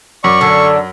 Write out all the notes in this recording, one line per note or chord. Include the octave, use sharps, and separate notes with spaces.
F#2 D5 C#6
D3 C#4 D4 A4